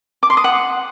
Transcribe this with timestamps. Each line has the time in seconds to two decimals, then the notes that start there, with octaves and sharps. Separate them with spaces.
0.23 D6
0.30 C6
0.37 D#6
0.44 F#5